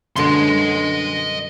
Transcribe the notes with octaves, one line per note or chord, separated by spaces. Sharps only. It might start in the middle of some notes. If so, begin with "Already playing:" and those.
F#2 B2 D3 D#5 C6